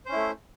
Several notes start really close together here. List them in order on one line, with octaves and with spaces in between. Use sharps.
C5 C#4 E4 A3